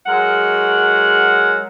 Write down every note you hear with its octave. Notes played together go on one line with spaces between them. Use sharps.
F#3 G#3 A#4 F#5